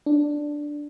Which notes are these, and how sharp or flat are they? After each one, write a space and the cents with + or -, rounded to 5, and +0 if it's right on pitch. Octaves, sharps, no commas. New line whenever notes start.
D4 +0